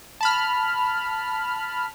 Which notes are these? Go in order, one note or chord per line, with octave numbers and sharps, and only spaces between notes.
A5 B5 F6